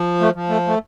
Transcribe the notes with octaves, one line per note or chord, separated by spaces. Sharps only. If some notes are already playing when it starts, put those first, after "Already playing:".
Already playing: F3
A3
F3
A3
A3